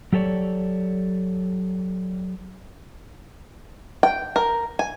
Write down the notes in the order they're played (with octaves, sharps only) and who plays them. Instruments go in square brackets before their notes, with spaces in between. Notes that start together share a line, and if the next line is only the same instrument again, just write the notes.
[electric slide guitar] F#3 G4 A4 C#5 D5
[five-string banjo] G5
A#4
G#5